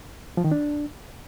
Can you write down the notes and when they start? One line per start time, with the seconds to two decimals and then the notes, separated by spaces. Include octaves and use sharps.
0.37 F3
0.44 D#3
0.52 D4